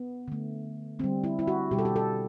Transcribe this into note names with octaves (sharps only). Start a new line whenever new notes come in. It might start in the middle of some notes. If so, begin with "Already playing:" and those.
Already playing: B3
D3 A3
D3 G3 C4
E4
E4
F#4
B2 G3 G4
A4
G4
A4